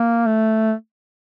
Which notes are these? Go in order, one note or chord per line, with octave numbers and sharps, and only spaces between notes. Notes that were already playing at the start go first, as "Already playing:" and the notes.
Already playing: A#3
A3